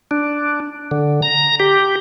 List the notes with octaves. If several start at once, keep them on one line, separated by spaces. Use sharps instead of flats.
D4
D3
A#5
G4